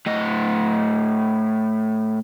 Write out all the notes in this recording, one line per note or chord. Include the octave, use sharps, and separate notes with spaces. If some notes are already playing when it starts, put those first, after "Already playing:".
A2 D#5